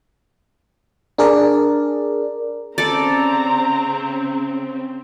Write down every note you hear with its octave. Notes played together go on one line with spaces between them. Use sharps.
D4 G#4 A#4 D5
C#3 C4 A4 D5 A#5